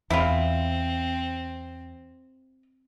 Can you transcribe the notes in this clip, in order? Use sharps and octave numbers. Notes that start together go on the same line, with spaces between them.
E2 C4 E4 F4